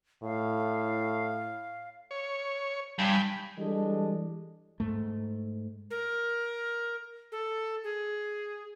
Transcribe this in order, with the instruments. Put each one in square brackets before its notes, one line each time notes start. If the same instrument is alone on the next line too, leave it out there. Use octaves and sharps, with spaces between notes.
[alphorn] A2 [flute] F5
[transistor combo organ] C#5
[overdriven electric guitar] G2 [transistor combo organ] G5 G#5 B5
[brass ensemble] E3 G3 G#3 D4 A4 D#5
[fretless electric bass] G#2 A3
[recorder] A#4
A4
G#4